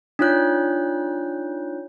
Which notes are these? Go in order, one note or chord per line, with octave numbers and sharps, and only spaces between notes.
D4 D#4 F4 C#5 F#6 G6